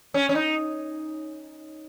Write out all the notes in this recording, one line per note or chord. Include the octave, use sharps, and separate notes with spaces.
C#4
C#4
D#4